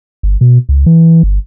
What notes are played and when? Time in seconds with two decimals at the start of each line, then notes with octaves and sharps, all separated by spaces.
0.23 G1
0.41 B2
0.69 C#2
0.86 E3
1.23 G1